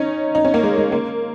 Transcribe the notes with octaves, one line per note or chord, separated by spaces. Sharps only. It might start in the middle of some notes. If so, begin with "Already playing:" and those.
Already playing: C#4 D#4
D#4
C#4
A#3
G#3
G#3
A#3